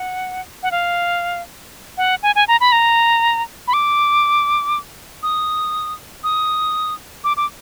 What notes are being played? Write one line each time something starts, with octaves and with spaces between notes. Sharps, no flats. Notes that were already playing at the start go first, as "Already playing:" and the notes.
Already playing: F#5
F#5
F5
F#5
G#5
G#5
A#5
B5
A#5
B5
D6
D#6
D#6
D6
D6